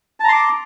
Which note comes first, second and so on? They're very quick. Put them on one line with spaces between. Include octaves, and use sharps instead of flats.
A5 A#5 C6 D6